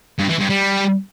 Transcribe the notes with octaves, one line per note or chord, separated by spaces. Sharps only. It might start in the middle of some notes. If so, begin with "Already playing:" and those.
G2
E3
G2
G3